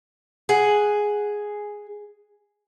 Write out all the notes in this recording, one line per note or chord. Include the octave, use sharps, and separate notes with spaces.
G#4 F#5